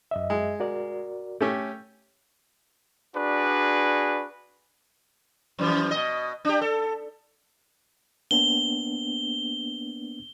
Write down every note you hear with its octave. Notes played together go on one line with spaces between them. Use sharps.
F#2 D#5 E5
G#3
F#4 A#4 D5
A3 C#4 G4 G6
D4 F#4 G#4 B4 D5
F#2 E3 F3
B2 D#5
D4 G4
A4
A#3 B3 D4 G7